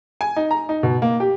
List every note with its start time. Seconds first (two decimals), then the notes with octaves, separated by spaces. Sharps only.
0.21 G#5
0.36 D#4
0.51 A#5
0.69 D#4
0.83 B2
1.02 A#3
1.20 G4